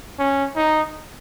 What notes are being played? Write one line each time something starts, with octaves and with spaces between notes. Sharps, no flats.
C#4
D#4